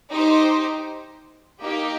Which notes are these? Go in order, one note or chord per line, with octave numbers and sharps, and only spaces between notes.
D#4 G4 C5
A#3 D#4 G4